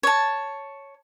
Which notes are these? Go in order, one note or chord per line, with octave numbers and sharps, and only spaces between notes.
C#5 A5